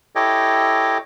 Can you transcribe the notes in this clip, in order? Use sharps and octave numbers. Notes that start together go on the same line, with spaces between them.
E4 G4 A4 C#5 D#5 G5